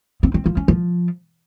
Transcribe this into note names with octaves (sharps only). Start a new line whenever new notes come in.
C4
C4
F3
C#4
F3